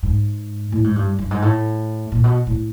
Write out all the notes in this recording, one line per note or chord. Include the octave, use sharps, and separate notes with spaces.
G#2
A2
G#2
G2
G2
G#2
A2
A#2
B2
A2